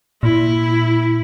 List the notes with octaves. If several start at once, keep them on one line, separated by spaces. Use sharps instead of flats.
A#2 E4